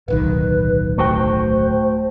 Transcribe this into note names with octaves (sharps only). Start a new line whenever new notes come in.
D1 B1 D#3 B4
A3 F#4 C5 G5